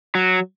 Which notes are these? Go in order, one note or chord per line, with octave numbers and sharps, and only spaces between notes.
F#3